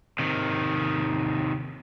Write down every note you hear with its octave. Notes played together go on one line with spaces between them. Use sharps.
C3 D#3